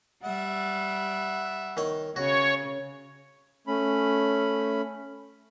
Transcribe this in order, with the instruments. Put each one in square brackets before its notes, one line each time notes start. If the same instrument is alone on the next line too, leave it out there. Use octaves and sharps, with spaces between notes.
[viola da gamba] G3 [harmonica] E5 F#5
[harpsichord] D#3 C#5
[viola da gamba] C#3 [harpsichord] F#4 [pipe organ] C#5
[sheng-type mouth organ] A3 C#4 B5